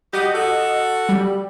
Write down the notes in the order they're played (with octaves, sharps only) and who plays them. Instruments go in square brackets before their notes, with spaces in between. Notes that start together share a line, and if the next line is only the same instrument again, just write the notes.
[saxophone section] F#4 G4 [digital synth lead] D#5
[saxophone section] F#4 A4
[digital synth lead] G3